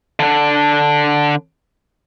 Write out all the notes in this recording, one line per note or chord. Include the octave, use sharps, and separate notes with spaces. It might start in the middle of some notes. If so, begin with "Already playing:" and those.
D3 D4